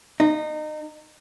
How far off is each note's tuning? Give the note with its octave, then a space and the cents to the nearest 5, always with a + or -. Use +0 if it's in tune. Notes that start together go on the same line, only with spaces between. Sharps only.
D#4 -25